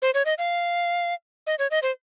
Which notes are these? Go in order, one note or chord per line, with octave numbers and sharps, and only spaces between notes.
C5
C#5
D#5
F5
D#5
C#5
D#5
C5